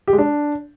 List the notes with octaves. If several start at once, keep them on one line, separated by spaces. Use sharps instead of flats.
G4
G#3
D4